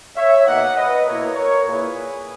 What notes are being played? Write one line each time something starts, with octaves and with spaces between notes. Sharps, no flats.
C#5 E5
B2 A#3 D#4 D#5 F#5
B4 D#5
B2 A#3 E4 A#4 C#5
A#4 C#5
A#2 A#3 E4 G#4 B4